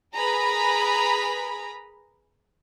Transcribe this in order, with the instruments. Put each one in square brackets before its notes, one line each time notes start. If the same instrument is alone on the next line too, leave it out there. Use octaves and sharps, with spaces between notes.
[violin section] G#4 A#4 B4 A#5 B5